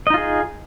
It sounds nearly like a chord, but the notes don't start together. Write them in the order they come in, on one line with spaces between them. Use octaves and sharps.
D#5 D#4 F4 G#4